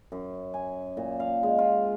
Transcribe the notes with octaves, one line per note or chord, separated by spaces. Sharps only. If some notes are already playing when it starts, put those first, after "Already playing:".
F#2
G#5
A#2
F5
G#3
F4